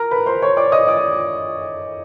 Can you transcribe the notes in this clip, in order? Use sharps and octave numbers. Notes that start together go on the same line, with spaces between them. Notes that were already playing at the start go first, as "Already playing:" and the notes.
Already playing: A#4 A#5
B4 B5
C5 C6
C#5 C#6
D5 D6
D#5 D#6
D5 D6